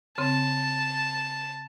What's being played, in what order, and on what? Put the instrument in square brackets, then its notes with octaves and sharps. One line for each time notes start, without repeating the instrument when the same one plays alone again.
[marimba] C#3 C4 [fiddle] A5